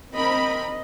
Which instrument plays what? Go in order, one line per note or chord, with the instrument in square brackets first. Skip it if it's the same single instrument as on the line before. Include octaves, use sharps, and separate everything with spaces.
[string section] C4 A#4 B5 [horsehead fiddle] D#5